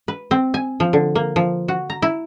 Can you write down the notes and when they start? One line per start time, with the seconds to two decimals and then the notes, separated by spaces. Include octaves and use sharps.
0.08 B4
0.31 C4
0.54 G#5
0.80 F3
0.93 D3
1.15 A#3
1.36 F3
1.68 F#4
1.90 A#5
2.02 E4